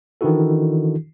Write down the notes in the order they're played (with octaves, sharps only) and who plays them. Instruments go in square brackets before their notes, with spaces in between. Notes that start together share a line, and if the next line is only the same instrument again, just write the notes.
[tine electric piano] D#3 E3 D4 E4 F#4 A4